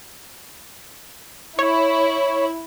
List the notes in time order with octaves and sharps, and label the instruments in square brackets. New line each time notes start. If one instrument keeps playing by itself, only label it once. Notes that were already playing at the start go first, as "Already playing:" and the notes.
[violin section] E4 [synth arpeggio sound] C#5